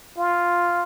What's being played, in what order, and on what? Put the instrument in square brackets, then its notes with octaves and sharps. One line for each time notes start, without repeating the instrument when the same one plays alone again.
[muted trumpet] F4